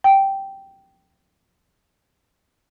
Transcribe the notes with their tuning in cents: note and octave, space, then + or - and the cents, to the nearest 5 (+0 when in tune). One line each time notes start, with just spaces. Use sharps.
G5 -10